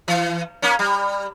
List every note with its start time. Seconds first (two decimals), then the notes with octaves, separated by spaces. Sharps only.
0.08 E3
0.62 A#3 C#4
0.79 G3